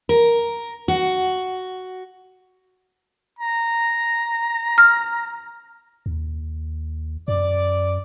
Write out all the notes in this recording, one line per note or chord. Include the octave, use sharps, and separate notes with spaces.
A#4
F#4
A#5
F6
D#2
F#2 D5